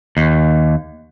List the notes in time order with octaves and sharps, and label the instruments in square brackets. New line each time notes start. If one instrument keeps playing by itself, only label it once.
[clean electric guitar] D#2